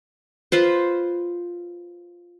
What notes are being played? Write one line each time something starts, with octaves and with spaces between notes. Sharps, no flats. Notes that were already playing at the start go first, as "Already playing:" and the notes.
F4 B4 C5